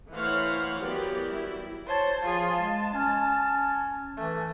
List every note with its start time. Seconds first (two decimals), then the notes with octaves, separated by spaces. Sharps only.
0.13 E3 A3 C5 C#5 F5 F#5
0.78 E3 F#3 B3 G4 A#4 D5
1.30 G3 E4 F#4
1.87 C5 C#5 A5
2.23 F3 F4 G#4
2.54 G#3 A5
2.93 C#4
4.17 E3 A3